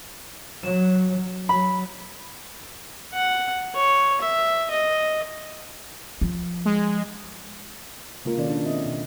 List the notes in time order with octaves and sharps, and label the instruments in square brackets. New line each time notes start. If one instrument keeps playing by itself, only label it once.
[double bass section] F#3 [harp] E7
[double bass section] F#3 [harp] B5
[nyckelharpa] F#5
C#5
E5
D#5
[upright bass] F3
[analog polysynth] G#3
[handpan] C#3 G#3 A#3 F4 A#4
B2 D#3 C#4 D#4 A4 D5
D4
C4 D4 F4 D#5 E5
B2